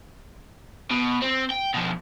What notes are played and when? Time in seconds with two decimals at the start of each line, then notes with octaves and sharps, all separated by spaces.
0.91 B2
1.22 C4
1.50 G5
1.74 B2 F3